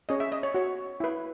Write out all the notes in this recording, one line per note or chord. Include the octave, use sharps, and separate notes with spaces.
C#4 G#4 C#5 D#5
E5
D#5
C#5
F#4 C#5
E4 B4